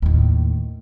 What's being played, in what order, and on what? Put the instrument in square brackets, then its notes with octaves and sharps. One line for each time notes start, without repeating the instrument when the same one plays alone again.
[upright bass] D#2 A2